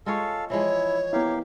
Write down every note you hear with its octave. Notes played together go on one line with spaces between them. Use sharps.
G#3 F4 A4 C#5 F5
E3 F3 G#3 E4 C#5
A#3 B3 E4 G4 F5